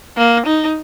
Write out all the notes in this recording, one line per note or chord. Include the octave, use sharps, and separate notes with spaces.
A#3
D#4